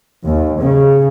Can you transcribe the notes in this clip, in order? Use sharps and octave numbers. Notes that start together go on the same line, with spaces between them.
D#2
C#3